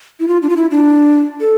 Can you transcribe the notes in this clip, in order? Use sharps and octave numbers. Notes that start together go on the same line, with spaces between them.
E4
F4
D4
F4
E4
D4
A4